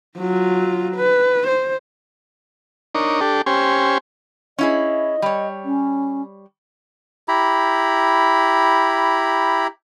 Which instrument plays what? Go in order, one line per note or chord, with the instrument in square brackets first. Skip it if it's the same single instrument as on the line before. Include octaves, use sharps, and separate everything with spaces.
[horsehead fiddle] F#3 F4
B4
C5
[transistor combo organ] D4 D#4 A#4 C#5
D4 G4 A4
C#4 G4 C5 G#5
[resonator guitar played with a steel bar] C#4 E4 G#4 [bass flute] D#5
[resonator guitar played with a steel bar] G3 C#5
[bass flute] C#4
[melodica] E4 G4 A#5 B5